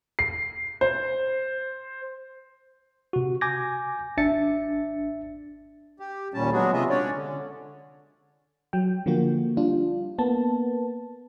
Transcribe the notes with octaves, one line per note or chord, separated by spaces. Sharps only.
C7
C5
C3 F#4
G#5 D6 G6 G#6 A#6
G#1 D4 E5 A6 C#7
G4
D#2 A#2 G3 C#4 A5
F#3 G#3 B3 D4 F#4 G#4
C3 G#3 F4 D#5 E5
C#4 D4 C#5 D5
D3
F#3 G5
D3 F3 A#3 F#4
G3 D4 F4
A#3 B3 A5